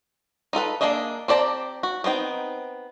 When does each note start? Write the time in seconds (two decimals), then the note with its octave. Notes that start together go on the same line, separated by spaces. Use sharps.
0.53 D#4 F4 A4 B4
0.81 A#3 D4 G#4 D#5 E5
1.28 C4 G4 D5 A5 A#5
1.83 F#4
2.04 B3 C4 D#4 G5